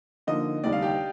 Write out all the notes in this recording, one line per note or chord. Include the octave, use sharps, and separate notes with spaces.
D3 F3 A#3 D#4 D#5
F1 D#2 D3 G3 D4 D5
F5
G4